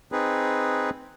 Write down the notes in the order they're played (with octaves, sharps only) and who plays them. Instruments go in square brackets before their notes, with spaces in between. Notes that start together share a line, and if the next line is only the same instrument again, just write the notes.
[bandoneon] C4 D#4 G#4 B4